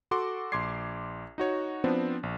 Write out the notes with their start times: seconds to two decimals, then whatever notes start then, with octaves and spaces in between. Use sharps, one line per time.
0.11 F#4 A4 F#5 C6 D6
0.52 A#1 C6 D6 G#6 C7
1.38 D#4 F#4 C#5
1.84 F3 B3 C4 D4
2.23 A#1